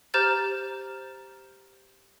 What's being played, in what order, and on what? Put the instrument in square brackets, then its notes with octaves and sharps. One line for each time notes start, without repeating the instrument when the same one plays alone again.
[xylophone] G4 C5 A#5 F6 G6 A6